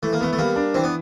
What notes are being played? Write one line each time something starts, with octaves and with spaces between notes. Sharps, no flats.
E3 A3
A#3
A3 B3
A3
G3 A#3
D4
E3 C4
B3